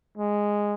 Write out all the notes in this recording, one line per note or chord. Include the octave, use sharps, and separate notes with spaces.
G#3